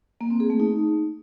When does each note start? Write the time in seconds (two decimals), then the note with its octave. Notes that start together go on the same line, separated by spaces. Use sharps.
0.21 A#3
0.30 C4
0.40 G#4
0.50 A3
0.60 D#4